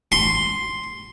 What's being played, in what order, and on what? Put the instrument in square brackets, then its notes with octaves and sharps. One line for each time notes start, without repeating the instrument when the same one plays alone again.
[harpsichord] C6